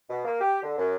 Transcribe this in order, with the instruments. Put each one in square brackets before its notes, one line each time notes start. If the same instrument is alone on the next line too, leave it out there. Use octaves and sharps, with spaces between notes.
[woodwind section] B2
A#3
G4
D3
F#2